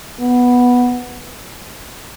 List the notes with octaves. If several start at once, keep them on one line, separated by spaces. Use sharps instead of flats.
B3